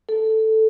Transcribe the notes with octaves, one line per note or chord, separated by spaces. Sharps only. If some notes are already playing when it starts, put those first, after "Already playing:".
A4